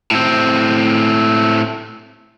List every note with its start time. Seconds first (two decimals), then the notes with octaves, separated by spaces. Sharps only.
0.11 A2 C4